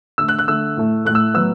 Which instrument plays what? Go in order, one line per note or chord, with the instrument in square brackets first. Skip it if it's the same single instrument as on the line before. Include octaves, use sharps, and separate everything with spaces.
[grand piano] D3 A3 E6
F#6
F#6
D3 A3 E6
A2 A3
A2 A3 F#6
E6
A2 F#3 B3 E6